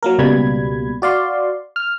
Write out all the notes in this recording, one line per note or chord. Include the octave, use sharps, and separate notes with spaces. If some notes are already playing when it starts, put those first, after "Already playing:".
F#3 A#3 A#4
C#2 B2 G3 A#3 B5 G#6
F#4 D5 F5 C6
F6